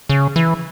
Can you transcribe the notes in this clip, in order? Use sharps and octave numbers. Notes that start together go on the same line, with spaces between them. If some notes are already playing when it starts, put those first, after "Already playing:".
C#3
E3